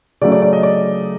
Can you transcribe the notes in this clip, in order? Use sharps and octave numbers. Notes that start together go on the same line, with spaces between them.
C#3 F#3 A3 D5
D5
D5
D#5
D5